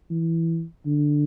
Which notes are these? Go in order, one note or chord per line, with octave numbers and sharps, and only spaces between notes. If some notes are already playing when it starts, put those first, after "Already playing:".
E3
D3